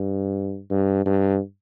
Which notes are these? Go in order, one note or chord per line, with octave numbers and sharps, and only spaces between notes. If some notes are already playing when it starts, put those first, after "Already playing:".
Already playing: G2
G2
G2